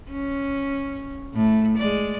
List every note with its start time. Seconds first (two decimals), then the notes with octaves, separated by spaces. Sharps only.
0.11 C#4
1.34 A2 A3
1.77 G#3 D5